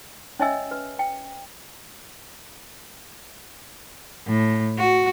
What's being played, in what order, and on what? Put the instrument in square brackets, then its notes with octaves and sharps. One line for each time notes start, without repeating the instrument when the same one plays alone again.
[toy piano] C#4 C#5 D#5 E5 G#5 E6
B4
G5
[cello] A2
F#4